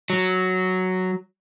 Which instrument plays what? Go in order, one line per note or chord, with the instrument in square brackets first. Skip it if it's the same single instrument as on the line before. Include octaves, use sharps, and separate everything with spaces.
[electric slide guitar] F#3